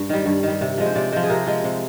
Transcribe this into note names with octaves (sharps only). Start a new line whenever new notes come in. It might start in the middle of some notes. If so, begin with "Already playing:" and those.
Already playing: G2
D#3 G3
G2
D#3 G3
C3
F3 G#3
C5
C3 D5
F3 G#3 C5
G#4
C3 A#4
F3 G#3
C3